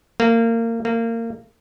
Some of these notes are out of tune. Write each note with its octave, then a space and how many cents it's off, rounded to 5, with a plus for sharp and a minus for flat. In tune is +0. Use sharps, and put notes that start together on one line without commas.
A#3 -25
A#3 -25